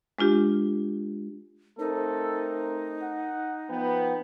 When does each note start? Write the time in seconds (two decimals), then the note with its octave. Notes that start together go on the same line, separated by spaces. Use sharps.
0.19 G#3 D4 F4 G4
1.79 A3 C4 D#4 A4 A#4
3.03 F#5
3.70 F3 B3 G5